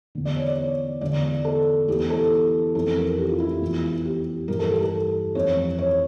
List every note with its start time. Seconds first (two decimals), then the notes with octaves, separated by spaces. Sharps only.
0.15 E2 D3
0.25 D5
0.36 C#5
0.47 D5
0.58 C#5
1.01 E2 D3 D5
1.23 D5
1.45 A4
1.87 E2 E3 G4
2.10 A4
2.75 F2 E3 A4
2.97 A#4
3.18 G4
3.29 F4
3.40 E4
3.51 F4
3.62 E2 E3
4.05 G4
4.48 G2 E3 A#4
4.59 A4
4.70 G4
4.80 A4
5.35 F2 E3 C#5
5.78 C#5